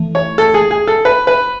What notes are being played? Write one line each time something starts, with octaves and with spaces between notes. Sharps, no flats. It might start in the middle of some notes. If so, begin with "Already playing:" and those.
Already playing: E3 A3
C#5
A4
G#4
G#4
A4
B4
B4